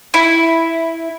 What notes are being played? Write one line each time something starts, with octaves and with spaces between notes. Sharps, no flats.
E4